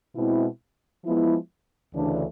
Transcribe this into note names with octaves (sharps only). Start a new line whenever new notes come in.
B2 G#3 C4 E4
F3 G#3 B3 E4
D2 C#3 E3 A3 D4